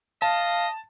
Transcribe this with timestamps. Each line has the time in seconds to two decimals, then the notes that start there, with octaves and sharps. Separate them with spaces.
0.22 D#5 F5 A5